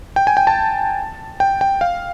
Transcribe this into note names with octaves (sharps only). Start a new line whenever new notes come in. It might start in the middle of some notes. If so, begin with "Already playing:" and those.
G5
G#5
G5
A5
G5
G5
F5